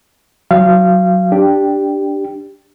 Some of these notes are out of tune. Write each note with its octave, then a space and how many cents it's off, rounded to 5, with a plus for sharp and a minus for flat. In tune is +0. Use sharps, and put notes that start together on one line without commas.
F#3 +0 F5 -25
D4 +0 G4 +0